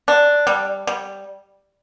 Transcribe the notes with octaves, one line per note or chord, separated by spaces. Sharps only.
D4
G3
G3